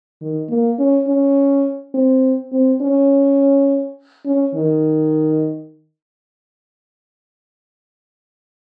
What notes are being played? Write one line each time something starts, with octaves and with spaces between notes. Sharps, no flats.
D#3
A#3
C#4
C#4
C4
C4
C#4
C#4
D#3